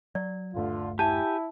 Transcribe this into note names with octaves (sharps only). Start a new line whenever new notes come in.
F#3 D5
D#1 G2 D3 A3 F4
E4 G4 G#5 A5